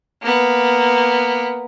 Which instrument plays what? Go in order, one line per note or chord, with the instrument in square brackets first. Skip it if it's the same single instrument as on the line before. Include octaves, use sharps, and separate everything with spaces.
[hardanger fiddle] A#3 B3